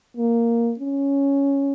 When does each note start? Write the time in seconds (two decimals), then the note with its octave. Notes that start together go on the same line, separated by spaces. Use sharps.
0.17 A#3
0.79 C#4